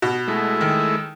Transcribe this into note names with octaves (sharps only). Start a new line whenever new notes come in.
B2
G#3 A3 E4
D#3